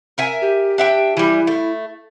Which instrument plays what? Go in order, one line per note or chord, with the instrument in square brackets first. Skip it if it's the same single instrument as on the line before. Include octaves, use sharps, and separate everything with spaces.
[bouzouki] A#4 E5 G#5
[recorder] G4
[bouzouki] D4 E5 G5
[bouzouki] E3 G3 [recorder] E4
[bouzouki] A3